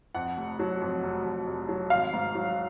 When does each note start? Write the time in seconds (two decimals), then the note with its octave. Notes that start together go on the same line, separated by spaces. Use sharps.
0.15 F2 F#5
0.38 F1
0.59 F#3
0.82 F2
1.03 F1
1.25 F1
1.47 F1
1.69 F#3
1.90 G#1 F5
2.14 G#2
2.35 F#3